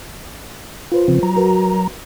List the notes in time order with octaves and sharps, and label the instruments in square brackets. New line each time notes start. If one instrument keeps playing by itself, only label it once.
[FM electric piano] F4 B4 C5
[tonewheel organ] C#3 F3 C4
F#3 A#5
[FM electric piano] F#4 A#4 B4